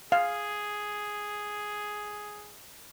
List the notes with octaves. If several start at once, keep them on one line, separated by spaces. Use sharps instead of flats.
G#4 F5